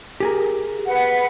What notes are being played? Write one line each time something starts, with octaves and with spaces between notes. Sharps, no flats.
G4 G#4 A#4
B4 F#5